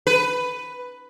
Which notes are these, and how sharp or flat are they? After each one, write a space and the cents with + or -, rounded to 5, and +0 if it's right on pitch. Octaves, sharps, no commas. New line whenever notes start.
B4 +10